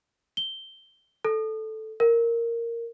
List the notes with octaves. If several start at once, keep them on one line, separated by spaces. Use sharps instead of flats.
G7
A4
A#4